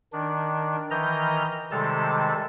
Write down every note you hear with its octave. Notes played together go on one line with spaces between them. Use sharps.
D#3 D4
D#3 E3 D#5 A#5 F6 G6
C3 D#3 G3 G#3 A4 A5